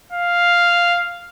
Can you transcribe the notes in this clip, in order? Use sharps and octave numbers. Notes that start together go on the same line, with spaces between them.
F5